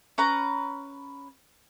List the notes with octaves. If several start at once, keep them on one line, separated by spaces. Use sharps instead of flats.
C#4 B4 A#5